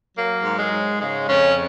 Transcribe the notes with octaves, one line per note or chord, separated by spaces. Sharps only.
F#3 A#3
G#2
G#3
G#2
C#3 G#3
F2 C#4